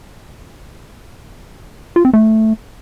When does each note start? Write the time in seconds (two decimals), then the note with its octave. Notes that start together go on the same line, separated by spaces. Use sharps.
1.96 F4
2.05 C4
2.13 A3